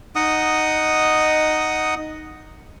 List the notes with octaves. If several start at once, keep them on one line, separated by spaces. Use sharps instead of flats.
D#4 D#5 F#5 D#6